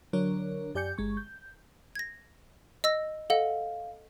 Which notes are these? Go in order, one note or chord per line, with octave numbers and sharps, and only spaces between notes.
D3 F#3 D4 A#4 C#5
F#2 G4 D5 G#5 G6 C#7
G1 G#3 C#6
G6
G#6 A#6
D#5 E6 A#6
A4 D#5 F5 F#5